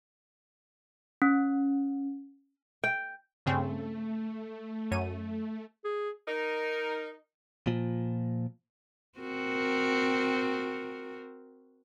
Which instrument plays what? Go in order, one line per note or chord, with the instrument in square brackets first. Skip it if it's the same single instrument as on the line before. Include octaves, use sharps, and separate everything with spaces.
[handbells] C#4
[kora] G5
[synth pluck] G2 C#3 C4 [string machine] A3
[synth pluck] F#2 C#5 D#7
[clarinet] G#4
[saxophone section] D#4 A#4
[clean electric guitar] A#2 F3
[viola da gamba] C4 F#4 A#4